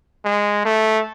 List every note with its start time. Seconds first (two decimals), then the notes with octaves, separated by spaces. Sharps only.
0.25 G#3
0.65 A3